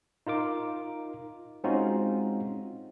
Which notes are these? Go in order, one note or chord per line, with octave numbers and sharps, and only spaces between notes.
D#4 F4 A#4 D6
G#3 C4 C#4 D#4 F4 F#4